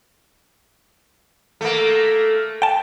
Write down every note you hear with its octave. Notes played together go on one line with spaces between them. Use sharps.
A3 A#3
G5 A5